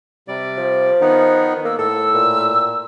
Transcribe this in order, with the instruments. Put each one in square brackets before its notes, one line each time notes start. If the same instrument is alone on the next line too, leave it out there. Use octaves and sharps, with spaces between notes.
[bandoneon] C3 G3 D5
[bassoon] F3
[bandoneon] D#3 B3 D#4 [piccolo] F#5
[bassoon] A#3 [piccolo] E6
[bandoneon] A2 [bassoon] A4 [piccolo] E6
[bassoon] A#2